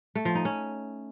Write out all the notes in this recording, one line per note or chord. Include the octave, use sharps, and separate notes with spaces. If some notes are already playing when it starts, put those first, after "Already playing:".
A3
F3
D#4
C#4